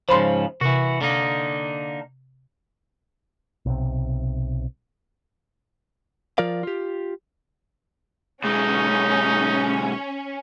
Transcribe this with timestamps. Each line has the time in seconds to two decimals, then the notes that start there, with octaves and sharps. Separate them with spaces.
0.09 G#2 C#3 F3 C5 B5 C6
0.61 C3 E3 F#4
1.01 D3 A#3 D#4
3.66 B1 C3
6.38 F3 F4 A#4 D5 F5
6.63 F4 G4
8.44 B1 G#3 C#4 D#4